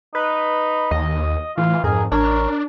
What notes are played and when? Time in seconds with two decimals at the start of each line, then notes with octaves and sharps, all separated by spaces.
0.15 D#4 B4
0.91 D#2 D#5
1.58 A2 E3 F4
1.84 F2 G#2 G#4 A#4
2.12 A1 D4 A#4 C#5